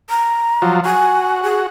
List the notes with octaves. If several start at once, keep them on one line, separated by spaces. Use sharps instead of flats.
A#5
F3 F#3
F#4 G#5
G#4